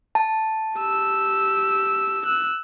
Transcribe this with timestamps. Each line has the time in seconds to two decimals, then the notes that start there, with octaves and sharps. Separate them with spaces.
0.15 A5
0.78 G4 E6
2.26 E6 F#6